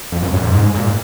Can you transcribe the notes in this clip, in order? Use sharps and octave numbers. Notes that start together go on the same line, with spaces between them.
F2
F#2
G2
G#2
G#2
A#2